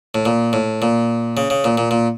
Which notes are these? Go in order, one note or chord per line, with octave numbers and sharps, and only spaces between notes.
A2
A#2
A2
A#2
C#3
C#3
A#2
A#2
A#2